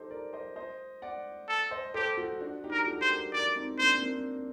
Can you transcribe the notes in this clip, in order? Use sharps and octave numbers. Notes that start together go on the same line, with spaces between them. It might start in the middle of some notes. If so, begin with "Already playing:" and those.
Already playing: D#4 G4 A4 C5
A#4 D5
C5 D#5
C5 D#5
D5 F#5
A4
C5 D#5
G4 A4 C5
F#4 A4
D4 F#4
D#4 G4
A#4
F#4 A4
C5
G4 A#4
G4 A#4 D5
C4 D#4
A#3 D4 C5
C4
A#3